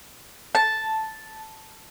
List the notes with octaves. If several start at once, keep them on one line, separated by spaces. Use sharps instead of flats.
A5